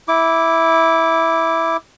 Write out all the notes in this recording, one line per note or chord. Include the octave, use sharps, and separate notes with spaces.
E4 D6